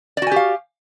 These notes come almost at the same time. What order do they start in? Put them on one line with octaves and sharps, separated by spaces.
D5 F#4 G#5 G4 F5